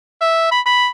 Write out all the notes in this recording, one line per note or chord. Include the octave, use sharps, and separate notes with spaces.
E5
B5
B5